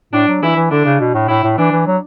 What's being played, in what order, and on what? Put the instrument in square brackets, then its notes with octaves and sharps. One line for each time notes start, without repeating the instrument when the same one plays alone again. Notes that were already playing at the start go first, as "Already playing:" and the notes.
[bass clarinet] A2 [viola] D4
[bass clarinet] F#3
[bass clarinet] E3 [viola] E4
[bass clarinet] E3
[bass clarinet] D3 [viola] D4
[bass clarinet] C#3
B2
A2
[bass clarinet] A2 [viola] E4
[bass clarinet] A2
[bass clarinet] E3 [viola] D4
[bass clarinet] E3
F#3